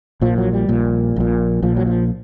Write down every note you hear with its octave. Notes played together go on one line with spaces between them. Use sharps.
A#1 A#2 F3
F#3
G3
A#1 A#2
A#1 A#2
A#1 A#2 F3
F#3
F3